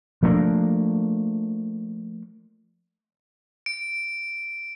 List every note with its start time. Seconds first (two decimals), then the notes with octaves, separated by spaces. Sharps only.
0.23 F3 A3 A#3 D4
3.66 D7